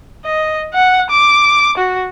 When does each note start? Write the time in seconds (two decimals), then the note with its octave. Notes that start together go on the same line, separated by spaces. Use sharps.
0.25 D#5
0.74 F#5
1.10 D6
1.77 F#4